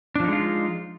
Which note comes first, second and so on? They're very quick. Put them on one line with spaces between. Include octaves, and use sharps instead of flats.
D4 F3 D#4 G#3 F4